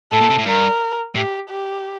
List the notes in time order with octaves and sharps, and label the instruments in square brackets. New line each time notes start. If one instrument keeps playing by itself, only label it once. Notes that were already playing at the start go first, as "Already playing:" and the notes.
[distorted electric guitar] A2 [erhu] A4
[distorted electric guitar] A#2
C3
A2
[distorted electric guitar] G2 [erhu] A#4
[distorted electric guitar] A2 [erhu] G4
[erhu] G4